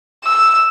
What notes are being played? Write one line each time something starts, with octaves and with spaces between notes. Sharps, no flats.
E6